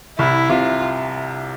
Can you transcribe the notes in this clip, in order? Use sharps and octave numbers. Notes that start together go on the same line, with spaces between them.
C2 E4
C3 F4